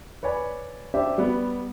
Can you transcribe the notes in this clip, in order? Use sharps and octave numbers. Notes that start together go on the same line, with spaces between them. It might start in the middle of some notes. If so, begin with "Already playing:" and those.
B4 C#5 D5 G#5 B5
D4 G4 C5 E5
G3 B3